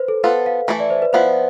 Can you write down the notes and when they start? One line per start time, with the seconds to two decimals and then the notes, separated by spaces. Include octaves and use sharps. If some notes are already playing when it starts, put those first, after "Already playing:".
Already playing: B4 C5
0.08 A4
0.23 B3 F4 A4 B4
0.46 F5
0.68 E3 A3 E4 A4 E5
0.80 D5
0.90 C5
1.02 B4
1.13 F3 B3 E4 C5